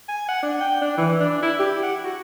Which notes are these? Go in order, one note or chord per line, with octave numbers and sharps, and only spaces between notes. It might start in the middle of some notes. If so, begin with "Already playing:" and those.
G#5
F#5
D4
G5
D4
E3
D4
E4
G4
F#5
F#4